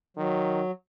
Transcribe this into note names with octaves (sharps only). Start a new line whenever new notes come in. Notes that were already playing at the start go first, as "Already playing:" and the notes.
D#3 F#3